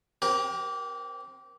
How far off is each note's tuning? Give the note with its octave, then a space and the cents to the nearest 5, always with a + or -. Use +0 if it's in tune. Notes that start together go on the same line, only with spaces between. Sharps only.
C4 +20 G4 -25 A#4 +30